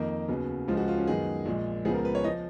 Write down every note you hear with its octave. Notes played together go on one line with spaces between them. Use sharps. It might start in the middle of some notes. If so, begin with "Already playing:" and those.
Already playing: F2 D#3 A#3 D#4
D#2 C#3 F#3 B3
C#2 C#3 F3 G#3 F4
F#4
F4
C#4
F#2 D#3 G#3 B3 G#4
A#1 A#2 G#3
C#2 C#3 F3 B3 G#4
A#4
B4
C#5
F3 D#5